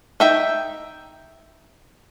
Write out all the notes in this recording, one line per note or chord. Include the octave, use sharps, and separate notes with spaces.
D#4 E5 G5